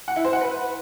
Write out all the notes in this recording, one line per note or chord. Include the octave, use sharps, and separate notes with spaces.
F#5
E4
C5
F#5
B4